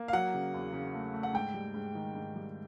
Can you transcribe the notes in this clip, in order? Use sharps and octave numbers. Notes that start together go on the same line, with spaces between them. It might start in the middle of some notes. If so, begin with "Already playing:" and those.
Already playing: A#3
F5
F#3 F#5
C#3
E2
C#3
A3
A3
F#5
G#2 G5
G3
G#2
D#3
G#2
G3